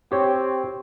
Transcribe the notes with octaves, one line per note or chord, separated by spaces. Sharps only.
C4 G4 C#5